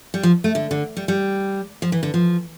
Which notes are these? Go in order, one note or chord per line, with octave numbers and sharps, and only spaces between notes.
G3
F3
A3
D3
D3
G3
G3
F3
E3
D3
F3